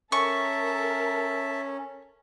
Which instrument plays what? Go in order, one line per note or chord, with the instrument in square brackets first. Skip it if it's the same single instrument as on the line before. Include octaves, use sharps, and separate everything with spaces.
[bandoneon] C#4 [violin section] A4 A#4 [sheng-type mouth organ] E5 A5 [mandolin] C#6